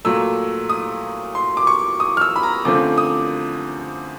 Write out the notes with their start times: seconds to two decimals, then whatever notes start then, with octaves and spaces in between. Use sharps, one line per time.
0.05 A#2 F#3 A3 E6
0.69 D#6
1.35 C6
1.57 D6
1.67 C#6
2.00 D#6
2.17 F6
2.21 E6
2.36 B5
2.43 A#5
2.65 F#2 D3 F3 A3 C4 D6
2.98 D#6